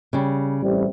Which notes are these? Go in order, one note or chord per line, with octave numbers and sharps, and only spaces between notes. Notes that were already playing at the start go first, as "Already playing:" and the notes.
C#3 G3
A1 C3 G3